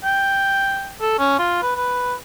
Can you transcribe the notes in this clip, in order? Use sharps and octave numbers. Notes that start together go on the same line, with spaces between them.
G5
A4
C#4
F4
B4
B4